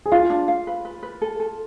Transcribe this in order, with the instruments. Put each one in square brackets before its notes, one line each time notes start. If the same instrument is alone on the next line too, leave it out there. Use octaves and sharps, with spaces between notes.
[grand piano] G#4
[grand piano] F4 [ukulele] F5
[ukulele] D4
F5
B4
B4
B4
A4
A4